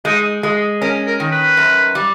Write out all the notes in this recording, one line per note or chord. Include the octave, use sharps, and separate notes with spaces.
G#3 D#4
G#3
C#4 A#4
A#4
D#3
B4
F#2
G3